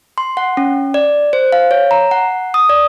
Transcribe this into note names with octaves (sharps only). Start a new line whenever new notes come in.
C6
F#5
C#4
D5
C5
F5
C#5
A#5
F#5
D#6
D5